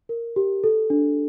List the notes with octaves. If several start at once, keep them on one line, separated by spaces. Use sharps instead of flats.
A#4
G4
A4
D4